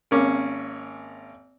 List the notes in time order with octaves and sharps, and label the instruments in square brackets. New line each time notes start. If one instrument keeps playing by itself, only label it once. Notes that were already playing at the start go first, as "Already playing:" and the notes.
[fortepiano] G#1 A#3 C#4 D6